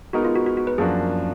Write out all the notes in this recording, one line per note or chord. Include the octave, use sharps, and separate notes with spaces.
G#3 B3 D#4 F#4 A#4
F4
F#4
F#4
F#4
B4
F#2 F3 A#3 D4 F#4 G#4